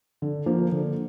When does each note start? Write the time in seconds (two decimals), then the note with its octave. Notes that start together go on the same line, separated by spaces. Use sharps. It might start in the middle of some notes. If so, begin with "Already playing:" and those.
0.22 D3
0.46 F3 A#3
0.72 D3